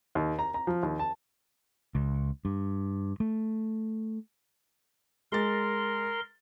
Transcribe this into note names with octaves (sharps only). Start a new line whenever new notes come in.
D#2
A#5
A#5
F3
D#2
A5
C#2
G2
A3
G#3 A#4 C6 A6